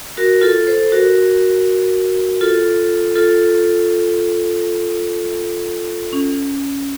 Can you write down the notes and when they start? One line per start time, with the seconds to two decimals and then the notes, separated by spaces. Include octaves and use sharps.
0.17 F#4 A#4
0.41 F4 A4
0.67 A4 C5
0.92 F#4 A#4
2.41 F4 A4
3.15 F4 A4
6.13 C#4